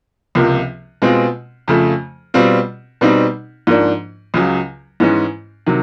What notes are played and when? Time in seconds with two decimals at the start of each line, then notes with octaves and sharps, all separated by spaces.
0.35 C#2 C3 F3 A#3
1.02 B2 G#3 C4 F4
1.68 F2 C#3 F3 A3
2.34 B2 G3 C4 F4
3.01 B2 G3 C4 D#4
3.67 G#2 F3 A#3 D4
4.34 C#2 C#3 F#3
5.00 G#2 E3 G#3 C#4
5.67 C3 D#3 F#3